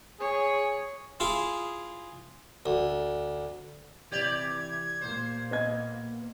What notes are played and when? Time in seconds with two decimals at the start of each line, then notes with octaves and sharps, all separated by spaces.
0.20 G#4 C#5
1.20 E4 F4 G#4
2.66 D2
4.12 C3 E3 G4 D5 G#6
5.01 A#2 A#3 C5
5.51 B3 D#5 G#6